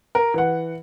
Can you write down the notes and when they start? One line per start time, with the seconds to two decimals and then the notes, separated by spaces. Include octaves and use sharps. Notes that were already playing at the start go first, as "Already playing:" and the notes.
0.15 A#4
0.34 E3 F#5